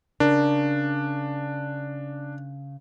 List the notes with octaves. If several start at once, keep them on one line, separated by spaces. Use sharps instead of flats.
C#3 D4 A#4